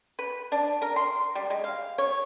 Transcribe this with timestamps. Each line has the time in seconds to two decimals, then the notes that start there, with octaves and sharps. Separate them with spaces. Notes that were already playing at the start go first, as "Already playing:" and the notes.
0.19 B4
0.52 D4
0.82 A#4
0.96 C6
1.35 G3
1.50 G#3
1.64 F5
1.98 C#5